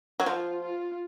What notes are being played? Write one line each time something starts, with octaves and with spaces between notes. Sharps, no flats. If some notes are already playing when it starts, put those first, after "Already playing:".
F#3
F3 F4
F4